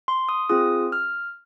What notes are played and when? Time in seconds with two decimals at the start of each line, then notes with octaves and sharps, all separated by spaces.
0.08 C6
0.29 D#6
0.49 C4 F4 G#4 D#6
0.92 F6